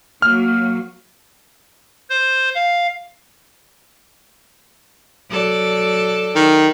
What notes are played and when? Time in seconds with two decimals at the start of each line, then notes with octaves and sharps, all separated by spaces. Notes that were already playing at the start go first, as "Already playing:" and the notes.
0.22 F#3 A#3 F6
2.10 C5
2.55 F5
5.31 F#3 A4 D5
6.36 D#3